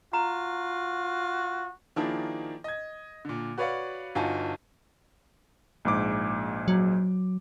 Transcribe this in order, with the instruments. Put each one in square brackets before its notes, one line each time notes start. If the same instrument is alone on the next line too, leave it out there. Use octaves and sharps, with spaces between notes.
[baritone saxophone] F4 [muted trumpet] F#4 [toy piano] A#5
[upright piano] D#3 F3 A#3 D4 E4 G#4
D#5 G#6
A#2 D3
F#4 B4 C#5 D5 F5 F#5
G1 D#4 F4 F#4 G#5 A5
[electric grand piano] A#1 G#2 D6
[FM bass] F#3